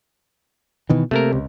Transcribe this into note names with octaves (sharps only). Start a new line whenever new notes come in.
B2 D#3 E3
C3 A3 A#3 A#4
C#2